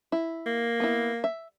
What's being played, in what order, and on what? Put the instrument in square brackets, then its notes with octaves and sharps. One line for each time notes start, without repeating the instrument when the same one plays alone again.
[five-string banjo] E4
[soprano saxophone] A#3
[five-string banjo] B3 E4
E5